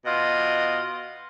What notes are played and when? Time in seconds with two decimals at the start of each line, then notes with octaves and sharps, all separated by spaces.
0.05 B2 F4 D#5